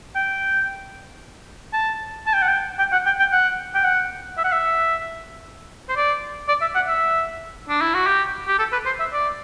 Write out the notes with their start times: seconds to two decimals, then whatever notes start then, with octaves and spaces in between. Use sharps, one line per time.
0.15 G5
1.73 A5
2.26 A5
2.33 G5
2.42 F#5
2.48 G5
2.79 G5
2.92 F#5
3.06 G5
3.19 G5
3.32 F#5
3.75 G5
3.84 F#5
4.37 E5
4.44 F#5
4.52 E5
5.89 C5
5.96 D5
6.48 D5
6.61 E5
6.75 F#5
6.88 E5
7.69 D4
7.81 E4
7.94 F#4
8.06 G4
8.48 G4
8.59 A4
8.72 B4
8.86 C5
9.00 E5
9.13 D5